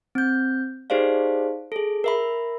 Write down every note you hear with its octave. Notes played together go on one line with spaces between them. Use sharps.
C4 G6
D#4 G4 G#4 C5 D5 F5
G#4 A4
A#4 E5 B5